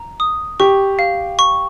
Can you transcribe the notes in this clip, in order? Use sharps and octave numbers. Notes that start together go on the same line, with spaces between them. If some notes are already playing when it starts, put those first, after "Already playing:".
Already playing: A#5
D#6
G4 C#6
F5
C#6